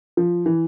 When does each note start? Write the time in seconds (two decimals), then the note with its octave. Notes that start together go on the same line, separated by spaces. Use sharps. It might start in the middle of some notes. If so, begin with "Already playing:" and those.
0.17 F3
0.46 E3